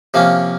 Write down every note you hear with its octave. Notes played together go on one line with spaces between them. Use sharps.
C3 F3 A#3 C#4